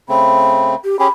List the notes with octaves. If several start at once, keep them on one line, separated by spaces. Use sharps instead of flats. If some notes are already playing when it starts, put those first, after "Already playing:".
C#3 A3 C4 B5
G4
C#4 G4 G#4 B5